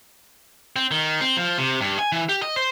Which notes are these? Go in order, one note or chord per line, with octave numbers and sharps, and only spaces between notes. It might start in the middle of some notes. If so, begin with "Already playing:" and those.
C4
D#3
C4
F3
C3
G2
G#5
E3
G4
D#5
C5